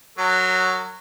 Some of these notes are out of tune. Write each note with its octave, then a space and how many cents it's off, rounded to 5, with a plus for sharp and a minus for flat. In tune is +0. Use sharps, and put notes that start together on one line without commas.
F#3 +0 A#4 -35